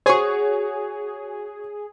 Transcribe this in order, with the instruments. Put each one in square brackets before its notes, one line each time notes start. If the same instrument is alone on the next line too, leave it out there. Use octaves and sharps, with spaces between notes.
[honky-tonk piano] F#4 C#5 [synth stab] G#4 [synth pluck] C5 C#6